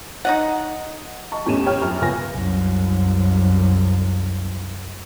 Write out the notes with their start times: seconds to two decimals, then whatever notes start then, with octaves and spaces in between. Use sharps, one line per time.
0.25 D#4 D#5 F#5
1.32 D#5 A5 C#6
1.46 E2 A2 C#4 G4 D#7 E7
1.65 G4 C#5 G5 F6
1.82 F#2 F3 F6
2.01 C#2 B3 G#5 A#6
2.33 C2 F#2